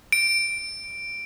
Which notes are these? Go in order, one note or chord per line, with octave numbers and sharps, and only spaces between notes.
D7